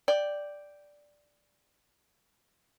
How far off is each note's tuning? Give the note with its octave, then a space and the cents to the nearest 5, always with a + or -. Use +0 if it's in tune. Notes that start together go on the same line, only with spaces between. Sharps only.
D5 +0 G5 +0